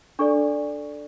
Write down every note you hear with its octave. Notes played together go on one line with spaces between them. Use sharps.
D4 A4 D5 C#6